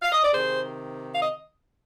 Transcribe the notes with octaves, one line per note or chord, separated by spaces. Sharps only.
F5
D#5
D5
C3 D#3 G#4 C5
F5
D#5